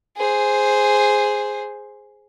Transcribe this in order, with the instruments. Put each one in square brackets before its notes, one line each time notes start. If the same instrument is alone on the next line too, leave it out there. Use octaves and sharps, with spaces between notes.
[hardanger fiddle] G#4 C5